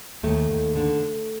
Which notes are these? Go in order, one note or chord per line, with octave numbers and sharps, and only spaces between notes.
D#2 A3
D#2
D3